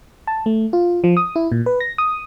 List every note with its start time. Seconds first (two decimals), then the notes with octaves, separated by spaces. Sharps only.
0.27 A5
0.46 A3
0.73 F4
1.04 F3
1.17 D#6
1.36 E4
1.52 A#2
1.66 B4
1.80 A#6
1.98 D#6